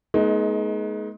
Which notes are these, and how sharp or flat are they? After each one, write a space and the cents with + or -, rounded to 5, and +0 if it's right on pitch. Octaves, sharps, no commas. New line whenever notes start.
G#3 +35 B3 -35 D#4 +15